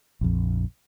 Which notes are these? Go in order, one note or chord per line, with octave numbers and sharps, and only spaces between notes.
A#1 F2